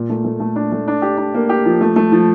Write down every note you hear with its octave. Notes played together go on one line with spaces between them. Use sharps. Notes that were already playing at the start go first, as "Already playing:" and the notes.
Already playing: A#2
A3
A3
A3
D4
A3
D4
G4
D4
A#3
G4
F3
A3
A3
F3